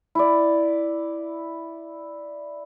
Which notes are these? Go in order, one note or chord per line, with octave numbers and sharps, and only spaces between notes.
E4 D5